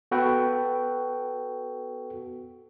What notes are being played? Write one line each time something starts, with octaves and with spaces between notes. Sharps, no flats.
B3 F#4 A4 B4 G5